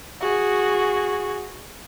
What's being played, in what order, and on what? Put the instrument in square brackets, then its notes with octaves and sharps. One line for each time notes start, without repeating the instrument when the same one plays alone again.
[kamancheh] F#4 G#4